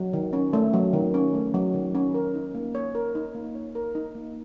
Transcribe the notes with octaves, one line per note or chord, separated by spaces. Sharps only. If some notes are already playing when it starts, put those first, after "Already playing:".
Already playing: F#3
D#3
C#4
A3
F#3
D#3
C#4
A3
F#3
D#3
C#4
A#4
D#4
A#3
C#5
A#4
D#4
A#3
C#5
A#4
D#4
A#3